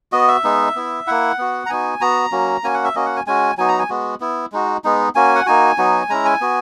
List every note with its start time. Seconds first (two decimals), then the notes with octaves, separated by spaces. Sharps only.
0.12 B3 F#4 D#5
0.28 E5
0.44 G#3 B3 D#4
0.75 B3 E4
1.07 A#3 E4 F#5
1.38 B3 F#4
1.66 A#5
1.69 B3 D#4 F#4 G#5
2.01 B3 F#4 A#5
2.32 F#3 A#3 C#4 F#4
2.64 A#3 C#4 F#4 G#5
2.74 F#5
2.84 E5
2.95 A#3 C#4 F#4 D#5
3.06 F#5
3.16 G#5
3.27 G#3 C#4 F#4 G#5
3.58 F#3 B3 D#4 F#4 G#5
3.68 A#5
3.79 G#5
3.90 G#3 B3 F#4
4.20 B3 E4
4.52 G#3 D#4 F#4
4.84 G#3 B3 D#4
5.15 A#3 C#4 F#4 G#5
5.35 F#5
5.46 A#3 D#4 F#4 G#5
5.78 F#3 B3 D#4 F#4
6.09 G#3 C#4 E4 A#5
6.25 G#5
6.40 B3 F#4